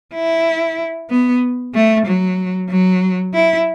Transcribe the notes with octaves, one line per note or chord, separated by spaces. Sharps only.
E4
B3
A3
F#3
F#3
E4